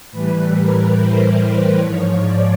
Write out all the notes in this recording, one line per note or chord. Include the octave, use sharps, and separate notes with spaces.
A2 E3 G3 B4
A#4
C5
C5
G#2 F3 C#5
D5